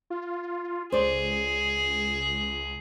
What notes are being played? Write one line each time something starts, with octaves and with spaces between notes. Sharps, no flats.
F4
C#2 G#4 C5 D5